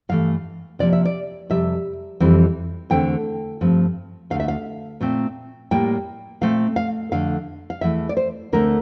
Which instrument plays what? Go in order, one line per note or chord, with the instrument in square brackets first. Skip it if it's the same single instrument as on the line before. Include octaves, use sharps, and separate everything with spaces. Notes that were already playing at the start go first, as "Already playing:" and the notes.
[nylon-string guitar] G2 E3 A3 F5
C3 F3 A#3 D5
E5
D5
F2 C3 G3 E5
F2 E3 G3 C4
E2 D3 A3 C4 G5
G2 F3 A3 C4
D2 D3 A3 F5
E5
F5
A#2 A3 C4
A2 G3 A#3 G5
A#2 A3 C4 F5
F5
F2 D3 A3 F5
F5
E2 E3 A3 E5
D5
C5
D2 D3 A3 C4 A#4